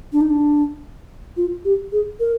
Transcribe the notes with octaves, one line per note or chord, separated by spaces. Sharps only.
D4
D#4
D4
F4
G4
G#4
A#4